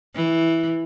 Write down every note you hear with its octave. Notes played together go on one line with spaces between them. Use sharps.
E3